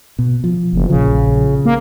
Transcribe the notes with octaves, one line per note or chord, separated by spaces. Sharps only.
B2
F3
F#1
A#1 C#3 F3
A#3